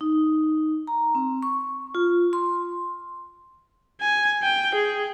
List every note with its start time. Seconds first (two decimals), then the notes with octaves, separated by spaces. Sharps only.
0.01 D#4
0.87 A#5
1.15 C4
1.43 C#6
1.95 F4
2.33 C6
4.01 G#5
4.43 G5
4.75 G#4